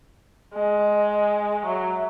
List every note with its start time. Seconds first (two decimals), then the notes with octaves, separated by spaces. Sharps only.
0.54 G#3 D#5
1.66 F#3 E5